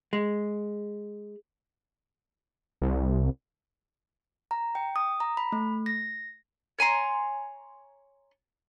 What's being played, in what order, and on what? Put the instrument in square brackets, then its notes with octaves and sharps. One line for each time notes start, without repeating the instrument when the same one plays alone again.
[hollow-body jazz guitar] G#3
[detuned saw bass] C2
[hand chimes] A#5
G5
D#6
A#5
B5
A3
A#6
[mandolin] C#5 G#5 A#5 C6